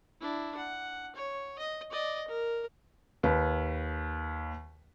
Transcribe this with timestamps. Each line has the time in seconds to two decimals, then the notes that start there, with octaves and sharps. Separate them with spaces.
0.21 D4 E4
0.57 F#5
1.15 C#5
1.58 D#5
1.91 D5 D#5
2.28 A#4
3.23 D#2 B4